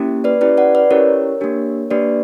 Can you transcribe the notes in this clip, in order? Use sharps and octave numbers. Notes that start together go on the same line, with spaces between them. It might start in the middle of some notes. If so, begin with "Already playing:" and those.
Already playing: A#3 C#4 E4 G4
B4 D5
C#4 E4 G4 B4 D5
D5 F#5
B4 D5
C#4 E4 G4 A#4 C#5
A#3 D4 G4
A#3 D4 G4 B4 D5